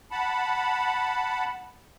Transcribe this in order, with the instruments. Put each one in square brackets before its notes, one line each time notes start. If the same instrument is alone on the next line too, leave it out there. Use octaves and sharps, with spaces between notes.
[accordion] F#5 A5 B5